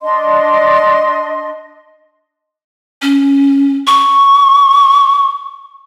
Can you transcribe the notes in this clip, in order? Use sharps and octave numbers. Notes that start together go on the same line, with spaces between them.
D4 D#5 C6
C#4
C#6